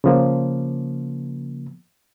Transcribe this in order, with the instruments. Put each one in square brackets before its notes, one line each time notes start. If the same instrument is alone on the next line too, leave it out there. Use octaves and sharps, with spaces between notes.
[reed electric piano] C#3 F3 A#3